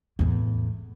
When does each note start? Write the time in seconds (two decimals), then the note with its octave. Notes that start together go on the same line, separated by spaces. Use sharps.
0.19 E2 A2